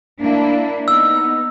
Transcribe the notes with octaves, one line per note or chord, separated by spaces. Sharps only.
A#3 D4 E4
B3 D#4 E6